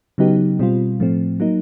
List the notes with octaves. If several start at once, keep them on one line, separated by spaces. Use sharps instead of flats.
C#3 F#3 B3 D#4 G4
B2 G3 C4 F4
A2 F3 A3 C4
F#3 A#3 D#4